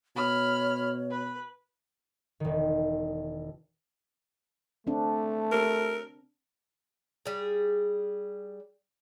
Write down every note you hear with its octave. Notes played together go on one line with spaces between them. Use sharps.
B2 C#5 B5 F6
B4
E1 D#3
A3 C4 D4
A#4
G3 G#4